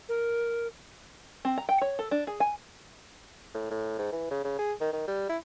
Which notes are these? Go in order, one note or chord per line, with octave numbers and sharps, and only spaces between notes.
A#4
C4
A#5
G5
C#5
A4
D4
G#4
G#5
A2
A2
G#2
E3
C#3
C#3
G#4
D#3
D#3
G3
E4